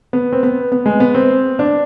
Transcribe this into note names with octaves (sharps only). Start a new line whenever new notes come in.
B3
C4
B3
B3
G#3
B3
C4
D4